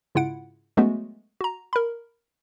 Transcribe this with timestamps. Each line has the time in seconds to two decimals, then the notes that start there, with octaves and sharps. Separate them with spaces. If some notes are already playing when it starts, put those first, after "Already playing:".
0.15 G#2 C#3 E4 F4 F#5 D7
0.77 F#3 G#3 A3 B3 C#4 F#4
1.41 F#4 A#5
1.73 A#4 B5